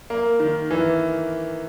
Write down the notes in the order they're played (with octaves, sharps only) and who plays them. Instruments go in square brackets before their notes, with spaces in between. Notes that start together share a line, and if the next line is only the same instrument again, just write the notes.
[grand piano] A#3
D#3
E3